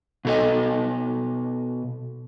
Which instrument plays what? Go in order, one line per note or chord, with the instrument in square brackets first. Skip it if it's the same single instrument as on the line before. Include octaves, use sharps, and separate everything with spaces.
[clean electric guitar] B2 A4 D#5